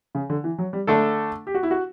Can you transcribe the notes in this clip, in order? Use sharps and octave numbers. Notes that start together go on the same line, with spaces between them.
C#3
D3
E3
F#3
G3
D3 A3 D4 A4
G4
F#4
E4
F#4